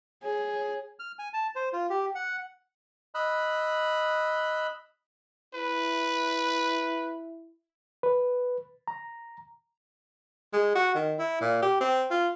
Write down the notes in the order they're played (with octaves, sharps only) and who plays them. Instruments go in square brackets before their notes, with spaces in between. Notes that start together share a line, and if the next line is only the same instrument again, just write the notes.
[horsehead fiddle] G#4 [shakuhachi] C#5
[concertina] F6
G#5
A5
C5
F4
G4
F#5
D#5 B5 E6 F#6
[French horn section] E4 [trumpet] B4
[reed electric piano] B4
A#5
[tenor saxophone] G#3
F#4
D#3
E4
A#2
G4
C4
F4